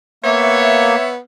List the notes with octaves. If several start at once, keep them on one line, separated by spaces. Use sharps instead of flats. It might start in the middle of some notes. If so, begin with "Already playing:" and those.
A#3 B3 C#5 E5